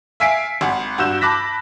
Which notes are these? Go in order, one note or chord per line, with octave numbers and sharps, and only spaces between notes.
E5 F5 G#5 B6 C7 D7
G#1 F#5
G2 F#4 E6 G6 E7
A5 B5 D6 F#6 A#6 B6